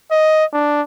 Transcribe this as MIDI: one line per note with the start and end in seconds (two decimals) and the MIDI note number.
0.11 0.45 75
0.53 0.82 62